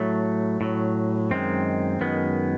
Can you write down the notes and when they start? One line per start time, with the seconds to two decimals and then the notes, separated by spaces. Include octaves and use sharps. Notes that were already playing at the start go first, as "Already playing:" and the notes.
Already playing: A2 F#3 A3
0.61 A2 F#3
1.31 F#2 D#3 G#3 C4
2.01 F#2 D#3 G#3 B3